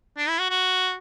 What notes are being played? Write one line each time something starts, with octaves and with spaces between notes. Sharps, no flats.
D4
E4
F#4
F#4